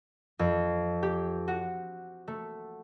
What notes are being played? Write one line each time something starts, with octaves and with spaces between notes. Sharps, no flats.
F2
G4
F#4
A3